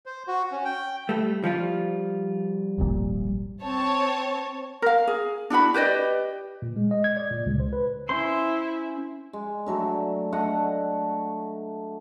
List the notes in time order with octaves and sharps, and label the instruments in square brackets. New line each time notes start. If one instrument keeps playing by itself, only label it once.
[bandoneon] C5
F#4
C#4
G5
[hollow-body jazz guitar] G3 A3
F3 G3 F4
[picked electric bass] D#1 G#1 A#2
[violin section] C4 C#5 A5
[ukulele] A#4 F5
G#4
D4 E4 F#4 B5
G4 B4 D5 D#5
[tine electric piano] A#2
G#3
D#5
G#6
D5
A#2
C#2
C5
B4
[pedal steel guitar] C#4 C5 C6 [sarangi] E4
[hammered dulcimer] G#3
D3 F#3 A3 A4
D3 A3 D#5 F#5